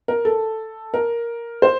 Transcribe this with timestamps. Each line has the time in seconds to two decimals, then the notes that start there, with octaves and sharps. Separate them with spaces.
0.08 A#4
0.25 A4
0.94 A#4
1.62 C5